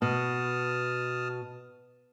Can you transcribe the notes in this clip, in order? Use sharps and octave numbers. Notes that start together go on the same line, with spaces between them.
B2 A5 D#6 F6